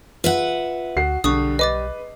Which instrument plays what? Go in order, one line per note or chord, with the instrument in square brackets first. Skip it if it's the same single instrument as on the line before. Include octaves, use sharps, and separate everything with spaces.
[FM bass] F4 [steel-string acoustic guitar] B4 E5 F#5
[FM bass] D2 [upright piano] F#4 C7
[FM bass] B1 [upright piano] D3 [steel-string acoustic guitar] G3 [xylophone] C#6 D#6
[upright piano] B4 [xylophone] D#5 D6 A6